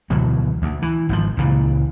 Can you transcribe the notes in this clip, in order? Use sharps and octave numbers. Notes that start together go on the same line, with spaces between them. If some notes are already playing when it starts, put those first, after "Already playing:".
D2 B2 E3 F#3
D2
E3
G#1 B2 F3
C#2 A#2 E3